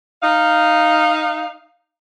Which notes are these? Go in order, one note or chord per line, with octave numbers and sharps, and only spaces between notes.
D#4 F5